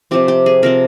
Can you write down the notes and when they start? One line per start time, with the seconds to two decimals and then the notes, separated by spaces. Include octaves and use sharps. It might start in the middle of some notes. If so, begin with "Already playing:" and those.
0.11 C3 F3 C4 G4
0.28 G4
0.46 G#4
0.63 C3 F3 C4 A#4